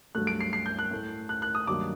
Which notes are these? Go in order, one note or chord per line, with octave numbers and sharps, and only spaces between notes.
G2 F#3 A3 F#6
D7
C7
C7
G6
F#6
A2 A3
F#6
F#6
D#6
G2 D#3 F#3 A#3 D6